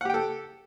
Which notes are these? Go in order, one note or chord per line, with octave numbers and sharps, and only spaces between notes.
G4 A4 F#5 G5